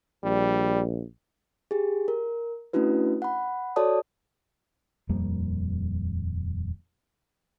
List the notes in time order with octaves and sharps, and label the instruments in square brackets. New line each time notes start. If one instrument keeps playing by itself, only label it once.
[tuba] A#1 [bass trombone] G3
[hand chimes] G4 G#4
A#4
A3 C#4 D4 E4 F#4 B4
F#5 B5
F#4 A4 C#5 D5 A5 D#6
[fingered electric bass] D#1 F2 G3 A#3